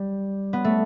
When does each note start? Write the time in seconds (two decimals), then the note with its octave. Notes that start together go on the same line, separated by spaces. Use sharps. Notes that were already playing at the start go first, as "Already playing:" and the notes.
Already playing: G3
0.53 B3
0.65 A3